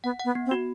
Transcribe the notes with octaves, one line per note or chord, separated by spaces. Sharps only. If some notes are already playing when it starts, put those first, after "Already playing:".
B3 F#5
F#5
B3
B3
C4
F#4